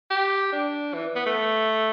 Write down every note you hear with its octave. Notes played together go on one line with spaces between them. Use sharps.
G4
D4
E3
B3
A3